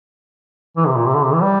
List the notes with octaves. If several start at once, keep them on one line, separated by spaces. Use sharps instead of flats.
E3
C3
A#2
C3
D3
C3
E3
G3